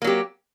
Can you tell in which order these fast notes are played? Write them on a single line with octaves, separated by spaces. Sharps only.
A#3 F#3 G4